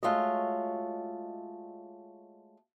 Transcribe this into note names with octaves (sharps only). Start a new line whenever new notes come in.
G#3 A3 F4 F#4 C#5 D#5